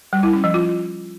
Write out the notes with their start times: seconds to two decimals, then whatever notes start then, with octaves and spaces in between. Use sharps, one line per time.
0.13 G3
0.23 E4
0.33 C#4
0.44 F3
0.54 F4